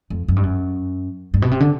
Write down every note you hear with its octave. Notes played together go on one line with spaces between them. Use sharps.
F2
F#2
G2
F#2
G2
B2
C3
D3